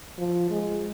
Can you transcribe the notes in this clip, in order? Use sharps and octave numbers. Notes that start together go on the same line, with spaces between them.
F3
G#3